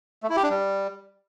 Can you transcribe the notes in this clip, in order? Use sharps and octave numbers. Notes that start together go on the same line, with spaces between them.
A3
E4
G4
D4
G3